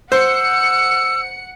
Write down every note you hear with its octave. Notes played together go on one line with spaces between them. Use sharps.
C5 F#5 E6 C#7